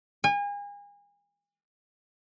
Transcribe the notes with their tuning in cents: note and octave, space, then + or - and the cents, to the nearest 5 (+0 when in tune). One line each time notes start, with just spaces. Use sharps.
G#5 -35